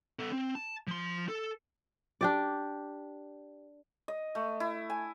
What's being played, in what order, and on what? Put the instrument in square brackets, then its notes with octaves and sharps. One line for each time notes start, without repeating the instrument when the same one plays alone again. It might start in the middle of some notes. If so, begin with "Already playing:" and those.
[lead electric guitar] B3 A4
C4
A5
F3 C6
A4
[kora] D4 G4 D5
[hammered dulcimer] D#5
A3
E4
G#5